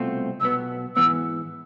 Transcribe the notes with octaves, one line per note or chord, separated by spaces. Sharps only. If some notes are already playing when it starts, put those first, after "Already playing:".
Already playing: C2 B2 A3 C4 F4
B1 B2 B3 E6
G#2 E3 B3 E6